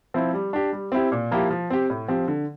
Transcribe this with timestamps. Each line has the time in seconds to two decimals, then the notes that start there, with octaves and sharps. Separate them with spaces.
0.14 F3 C4 E4
0.33 G3
0.53 D4 G4
0.72 G3
0.92 C4 E4 G4
1.12 A#2
1.31 F3 A#3 E4 G4
1.51 F3
1.70 C4 G4
1.90 A2
2.08 F3 C4 G4
2.28 D3